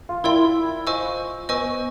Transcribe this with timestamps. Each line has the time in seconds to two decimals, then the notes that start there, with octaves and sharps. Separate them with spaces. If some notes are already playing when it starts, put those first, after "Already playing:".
0.09 F4
0.24 E4 A#4 D5 G5 C6
0.87 F4 C5 D#5 G#5 C#6 E6
1.49 B3 C5 D#5 G#5 C#6 E6